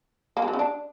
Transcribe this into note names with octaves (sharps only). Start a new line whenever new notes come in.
A#3
G#3
F#3
C#3
D4